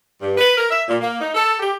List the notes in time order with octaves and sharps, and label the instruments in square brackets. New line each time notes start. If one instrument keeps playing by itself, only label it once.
[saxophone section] G2
B4
A#4
E5
A#2
A#3
D#4
A4
G4